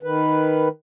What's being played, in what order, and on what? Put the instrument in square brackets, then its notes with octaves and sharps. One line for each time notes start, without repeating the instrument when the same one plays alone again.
[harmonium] D#3 B4